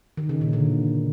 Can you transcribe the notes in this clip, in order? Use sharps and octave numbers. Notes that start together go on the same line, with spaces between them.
D#3
C#3
A#2
D3